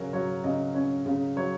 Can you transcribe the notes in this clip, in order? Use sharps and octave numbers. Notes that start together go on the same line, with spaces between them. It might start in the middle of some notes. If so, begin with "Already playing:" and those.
Already playing: C#3 F#3 C#4 A#4
F#3 C#5
C#3 D#5
C#4 C#5
C#3
F#3 C#5